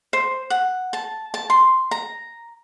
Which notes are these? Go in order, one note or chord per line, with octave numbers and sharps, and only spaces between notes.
C5
F#5
A5
A5
C6
A#5